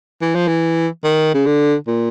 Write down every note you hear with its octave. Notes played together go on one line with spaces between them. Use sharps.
E3
F3
E3
D#3
C#3
D3
A#2